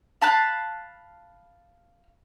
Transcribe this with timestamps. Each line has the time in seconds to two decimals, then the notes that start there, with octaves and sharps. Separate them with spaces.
0.21 F5 A5 B5 F#6